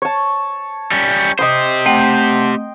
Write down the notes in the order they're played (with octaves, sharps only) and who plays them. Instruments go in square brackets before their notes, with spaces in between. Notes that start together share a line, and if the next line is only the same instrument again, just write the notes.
[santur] C#5 A5
[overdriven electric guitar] G3 C#4
[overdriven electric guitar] G4 C5 [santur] D#5 C6 D#6
[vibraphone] A3 C4 F#5 [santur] G5